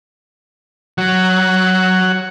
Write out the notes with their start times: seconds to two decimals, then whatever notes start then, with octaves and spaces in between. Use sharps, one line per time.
0.98 F#3 F#4 C#5 F#5